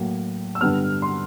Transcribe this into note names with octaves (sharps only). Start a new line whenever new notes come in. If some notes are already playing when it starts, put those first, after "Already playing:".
Already playing: A2 F#3 A#3
E6
G2 D3 G3 B3 F6
C6